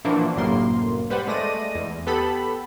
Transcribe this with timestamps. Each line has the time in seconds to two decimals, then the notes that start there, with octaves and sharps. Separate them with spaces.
0.05 A#2 E3 F3 A#3 D4 F#4
0.36 G1 C2 F#2 A2 A#3 C6
1.10 G3 B4 C5 F#5
1.27 G#3 A3 D5 A#6 D#7
1.75 E2
2.07 B3 G4 A4 B5